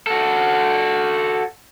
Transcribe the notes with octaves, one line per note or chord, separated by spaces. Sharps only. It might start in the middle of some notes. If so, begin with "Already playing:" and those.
F#4 A4